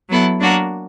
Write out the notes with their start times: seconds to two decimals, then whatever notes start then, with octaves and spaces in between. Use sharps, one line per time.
0.09 F#3 B3 E4 A4
0.39 F#3 A#3 D4 F#4 A#4